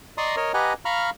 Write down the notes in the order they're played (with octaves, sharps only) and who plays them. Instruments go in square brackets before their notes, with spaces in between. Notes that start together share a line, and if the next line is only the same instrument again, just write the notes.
[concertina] D5 D#5 A#5 C6 C#6 D#6
A#4 C#5 D#5
G4 B4 D#5 F#5 G#5 A#5
F5 A#5 B5 C#6 F6